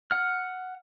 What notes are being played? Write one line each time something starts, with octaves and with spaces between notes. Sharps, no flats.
F#5 F6